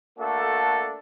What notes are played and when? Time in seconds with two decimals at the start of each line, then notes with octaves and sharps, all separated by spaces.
0.19 A3 A#3 D4 F#4 A4